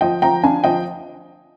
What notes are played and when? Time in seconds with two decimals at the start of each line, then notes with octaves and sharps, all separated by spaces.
0.01 F3 D#5 G5
0.22 F3 G5 A#5
0.43 D4 F5 G#5
0.64 F3 D#5 G5